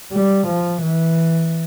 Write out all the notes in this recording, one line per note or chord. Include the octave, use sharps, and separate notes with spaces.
G3
F3
E3